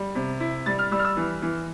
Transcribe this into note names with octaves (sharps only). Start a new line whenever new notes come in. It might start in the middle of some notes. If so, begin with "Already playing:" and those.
Already playing: G3
C3
E4
G3 A6
F6
G3 E6
F6
E6
E3
E3